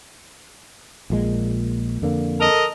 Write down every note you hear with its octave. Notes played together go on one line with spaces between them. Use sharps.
A#1 A#2 G#3
F2 D3 A#3
A4 A#4 D#5